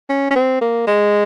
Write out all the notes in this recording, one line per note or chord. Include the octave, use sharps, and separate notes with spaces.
C#4
C#4
C4
A#3
G#3